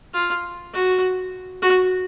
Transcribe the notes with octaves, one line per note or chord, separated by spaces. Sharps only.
F4
F#4
F#4